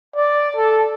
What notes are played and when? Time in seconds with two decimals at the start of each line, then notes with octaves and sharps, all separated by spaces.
0.16 D5
0.56 A4